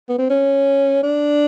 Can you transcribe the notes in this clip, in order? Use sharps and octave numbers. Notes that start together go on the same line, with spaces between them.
B3
C4
C#4
D4